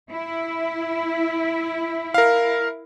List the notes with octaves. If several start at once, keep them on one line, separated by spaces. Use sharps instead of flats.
E4
A#4 F5